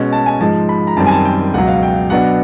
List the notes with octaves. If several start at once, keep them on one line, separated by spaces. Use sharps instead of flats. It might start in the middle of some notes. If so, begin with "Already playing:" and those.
Already playing: B2 G#3 C#4
A5
G#5
G#2 F3 G#3 A5
B5
A#5
F#2 D#3 G3 C4 A5
G#5
A5
G5
C#2 B2 F#3 F#5
F5
G5
B2 F#3 B3 D4 F#5